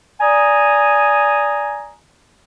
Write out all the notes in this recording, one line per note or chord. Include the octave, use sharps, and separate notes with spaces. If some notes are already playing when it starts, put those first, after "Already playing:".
D5 G#5 A#5 D#6